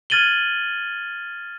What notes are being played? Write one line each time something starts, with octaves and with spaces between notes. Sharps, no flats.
F6 G#6 A6 D#7 F#7 G7